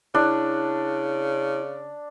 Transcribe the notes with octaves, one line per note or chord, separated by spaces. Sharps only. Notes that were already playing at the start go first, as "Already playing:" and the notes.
C#3 D4 E4